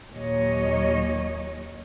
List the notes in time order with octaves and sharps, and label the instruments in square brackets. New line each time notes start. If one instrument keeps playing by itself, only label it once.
[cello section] D#2 A#2 F#3 C#5 D#5